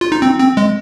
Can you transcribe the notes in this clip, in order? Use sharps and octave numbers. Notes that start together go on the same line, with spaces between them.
F4
D#4
C4
C4
G#3